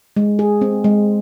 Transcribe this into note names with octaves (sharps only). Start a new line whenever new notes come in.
G#3
G#4
C4
G#3